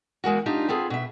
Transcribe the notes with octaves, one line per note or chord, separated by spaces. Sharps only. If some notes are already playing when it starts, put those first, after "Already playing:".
E2 G#3 A#3 F#4
D4 D#4 F4 G4
B3 C4 F4 G#4 A4
B2 E5